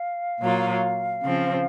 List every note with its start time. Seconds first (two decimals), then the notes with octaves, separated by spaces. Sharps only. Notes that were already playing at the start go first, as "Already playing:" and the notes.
Already playing: F5
0.40 A#2 F#3 A#3 F4
1.24 C#3 F3 C4